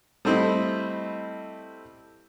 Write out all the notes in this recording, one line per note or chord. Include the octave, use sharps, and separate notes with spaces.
G3 A3 C4 E4 D#5